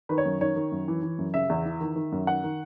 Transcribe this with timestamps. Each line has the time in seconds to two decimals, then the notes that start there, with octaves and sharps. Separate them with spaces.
0.09 D#3 B4
0.18 C#5
0.25 F#2
0.41 D#3 C#5
0.56 D#3
0.72 F#2
0.88 E3
1.03 E3
1.19 F#2
1.34 C#3 E5
1.49 E2
1.65 E3
1.81 D#3
1.96 D#3
2.12 F#2
2.27 D#3 F#5
2.43 D#3